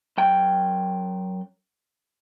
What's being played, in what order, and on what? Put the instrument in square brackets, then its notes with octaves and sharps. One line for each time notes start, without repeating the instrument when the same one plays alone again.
[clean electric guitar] F#2 G5